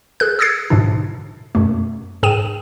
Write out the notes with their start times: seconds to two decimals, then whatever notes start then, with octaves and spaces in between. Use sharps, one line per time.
0.20 G#4 A4 F#6
0.39 D#6 E6 G#6 A6 C7
0.70 G#2 B2 D3 D4
1.55 F#2 B2 A3
2.23 G#2 G#4 G5 D#7 E7